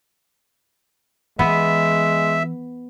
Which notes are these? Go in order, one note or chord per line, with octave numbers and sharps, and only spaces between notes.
E3 G#3 B3 E5